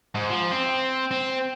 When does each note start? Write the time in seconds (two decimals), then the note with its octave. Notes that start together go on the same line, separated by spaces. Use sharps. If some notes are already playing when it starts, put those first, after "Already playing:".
0.15 G#2
0.30 F3
0.52 C4
1.11 C4